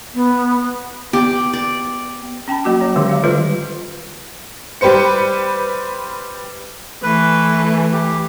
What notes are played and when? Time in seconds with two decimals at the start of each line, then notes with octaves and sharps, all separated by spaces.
0.14 B3
1.13 B3 G4 D5 G5
1.53 D5
2.48 C#4 G5 A5 B5
2.65 F#3 A#3 F#4 D6
2.80 C#4 C#5
2.96 D3 D#3 G#3 G4 D6
3.08 C#5 F5
3.24 D#3 G3 F4 A4 B4
4.81 G3 G4 B4 C5 C#7
7.03 E3 A3 B4
7.92 G4